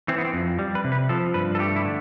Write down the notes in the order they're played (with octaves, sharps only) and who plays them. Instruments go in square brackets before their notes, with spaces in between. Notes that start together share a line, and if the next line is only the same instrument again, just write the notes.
[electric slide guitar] E3 C4
B3
C4
F2
G3
B4
C3
B4
F3 A4
G2 B4
A4
A3 G4
E4
D3